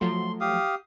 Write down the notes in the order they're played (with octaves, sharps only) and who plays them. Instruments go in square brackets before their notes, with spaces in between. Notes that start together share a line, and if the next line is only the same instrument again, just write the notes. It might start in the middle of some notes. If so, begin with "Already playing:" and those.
[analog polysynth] F3 F#3 A3 [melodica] C6
[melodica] G4 F5 D#6